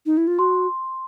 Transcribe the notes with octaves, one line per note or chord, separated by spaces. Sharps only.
D#4
E4
F4
F#4 C6